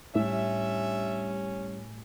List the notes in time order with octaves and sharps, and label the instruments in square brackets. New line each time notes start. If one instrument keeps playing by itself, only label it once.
[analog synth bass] A2 [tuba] G3 [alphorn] C#4 [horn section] D4 E5